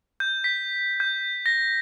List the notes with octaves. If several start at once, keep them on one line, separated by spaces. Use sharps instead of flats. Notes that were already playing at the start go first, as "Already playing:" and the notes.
G6
B6
G6
A#6